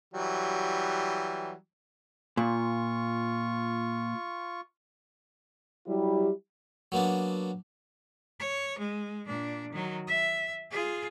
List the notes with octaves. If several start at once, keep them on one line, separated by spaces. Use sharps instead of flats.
E3 F#3 G3
A#2 F4 C#6
F#3 G3 E4 G4
F#3 A#3 B3 D4
C#5
G#3
A#2 D4
D#3 F#3
E5
F4 G#4